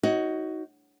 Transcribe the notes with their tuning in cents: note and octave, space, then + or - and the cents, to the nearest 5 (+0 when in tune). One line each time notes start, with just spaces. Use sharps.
D#4 +25 F#4 +15 C#5 +0